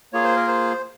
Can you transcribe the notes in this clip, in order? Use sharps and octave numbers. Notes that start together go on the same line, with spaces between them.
A#3 F4 G#4 C#5
C5
A#4
C5